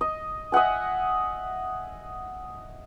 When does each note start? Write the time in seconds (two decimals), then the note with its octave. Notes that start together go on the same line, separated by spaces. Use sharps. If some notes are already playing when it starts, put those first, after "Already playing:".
0.01 D#5
0.52 D#5 E5 F#5 G#5